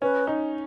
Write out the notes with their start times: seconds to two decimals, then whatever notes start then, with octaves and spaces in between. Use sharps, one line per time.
0.02 C#4 B4
0.27 D#4